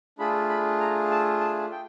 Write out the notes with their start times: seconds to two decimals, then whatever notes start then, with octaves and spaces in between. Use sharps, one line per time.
0.18 A3 D4 F4 G#4 B5
0.49 B5
0.80 A#5
1.11 A5
1.40 A5
1.72 G5